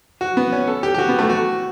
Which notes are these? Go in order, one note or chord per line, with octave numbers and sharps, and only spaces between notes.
F#4
B3
C#4
A4
G4
G4
F#4
B3
A3
F#4